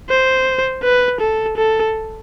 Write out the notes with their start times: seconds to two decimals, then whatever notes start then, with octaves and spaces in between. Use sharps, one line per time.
0.09 C5
0.83 B4
1.20 A4
1.57 A4